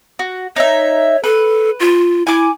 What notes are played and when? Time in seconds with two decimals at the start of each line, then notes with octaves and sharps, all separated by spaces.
0.19 F#4
0.56 D#4 C#5 E5
1.24 A4 B4
1.80 F4
2.27 E4 G#5 D6